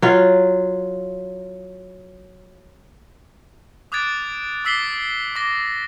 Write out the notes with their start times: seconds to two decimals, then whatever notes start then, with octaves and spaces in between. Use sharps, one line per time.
0.02 F#3 F4
3.92 D6 D#6 F#6 G#6 A6 D7
4.65 D6 E6 B6 C7 G7
5.36 D6 A#6 G7